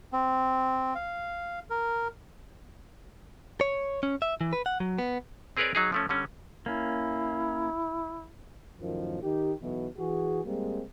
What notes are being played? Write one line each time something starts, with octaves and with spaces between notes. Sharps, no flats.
C4
F5
A#4
C#5
C#4
E5
E3
B4
F#5
F#3
B3
C4 G#4 A#4 B4 C#5 D5
F#3 D#4 G#4
F3 A3 C#4
D3 G3 C#4
A#3 C#4 E4
F#2 A2 D#3 F3
D#3 D#4 G4
B1 B2 E3
E3 F#4 G#4
G3 G#3 A#3 C4